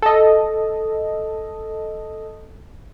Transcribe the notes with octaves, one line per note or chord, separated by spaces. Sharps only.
A4 D#5